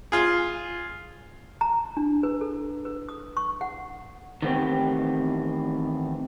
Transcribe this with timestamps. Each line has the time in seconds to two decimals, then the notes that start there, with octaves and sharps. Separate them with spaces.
0.12 F4 G#4
1.61 A#5
1.97 D4
2.23 B4
2.41 A4
2.85 B4
3.09 D#6
3.37 C#6
3.61 F#5
4.42 D#3 E3 A3 B3 C4 G4